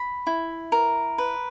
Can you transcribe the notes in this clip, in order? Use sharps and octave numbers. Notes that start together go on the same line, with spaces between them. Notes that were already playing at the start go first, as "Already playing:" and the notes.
Already playing: B5
E4
A#4
B4